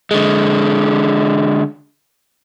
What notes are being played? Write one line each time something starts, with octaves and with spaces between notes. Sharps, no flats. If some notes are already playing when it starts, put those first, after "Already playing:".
D3 G#3